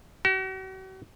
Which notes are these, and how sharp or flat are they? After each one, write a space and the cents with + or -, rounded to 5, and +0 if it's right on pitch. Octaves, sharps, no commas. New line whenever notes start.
F#4 +40